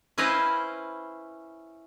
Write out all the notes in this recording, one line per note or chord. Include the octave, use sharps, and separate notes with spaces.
C#4 E4 B4 C5 D#5 F5